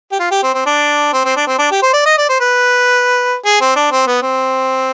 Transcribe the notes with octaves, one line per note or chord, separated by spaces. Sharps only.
G4
F4
G4
C4
C4
D4
C4
C4
D4
C4
D4
G4
C5
D5
D#5
D5
C5
B4
G#4
C4
D4
C4
B3
C4